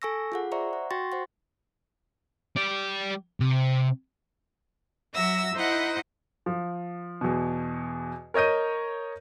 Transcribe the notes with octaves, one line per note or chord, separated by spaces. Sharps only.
A4 G#5 C#6 E6 A#6
F4 G#4 F#5
C5 D5 E5 A#5 C#6
F#5
F#4 G5 C6 C#6 A6 A#6
C5 F#5 C6
G3 D5
C3
F#3 F#4 E5 E6 A#6
D#4 E4 C5 D#5 F#5
F3
E2 B2
A#4 C#5 D#5 G6 D#7